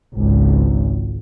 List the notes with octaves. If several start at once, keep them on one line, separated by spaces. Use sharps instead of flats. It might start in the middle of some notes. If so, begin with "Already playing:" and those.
G#1 C#2